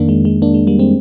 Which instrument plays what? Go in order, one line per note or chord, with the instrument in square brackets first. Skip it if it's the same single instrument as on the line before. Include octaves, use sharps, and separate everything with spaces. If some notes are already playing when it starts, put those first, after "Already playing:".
Already playing: [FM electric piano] F2 D#3 A#3 D4
G#3
G#3
A#3 D4
G#3
G3 A#3
G#3 C4